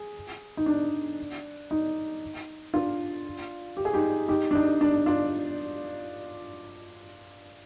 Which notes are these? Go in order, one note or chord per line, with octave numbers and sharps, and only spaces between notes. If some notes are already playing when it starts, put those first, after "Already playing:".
Already playing: G#4
D#4
D4
D#4
D4 F4
G4
G#4
D#4 G4
D#4 G4
D4
D#4
D4
D4 F4